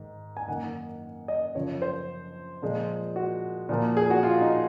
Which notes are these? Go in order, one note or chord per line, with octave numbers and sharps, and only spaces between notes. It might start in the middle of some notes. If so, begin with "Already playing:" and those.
Already playing: G#2 D#3
G#5
F#2 D#3 A#3 F#5
D#5
F#2 C#3 F3 C#5
C5
A#2 F3 G#3
F#4
A#2 F3 A#3
G#4
F#4
F4
D#4